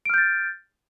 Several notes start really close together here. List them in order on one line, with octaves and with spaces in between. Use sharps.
D7 F6 G6 A6